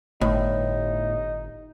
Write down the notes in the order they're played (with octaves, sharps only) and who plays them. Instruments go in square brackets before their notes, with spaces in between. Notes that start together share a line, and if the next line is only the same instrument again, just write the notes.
[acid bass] G1 [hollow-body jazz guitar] A2 [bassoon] D#4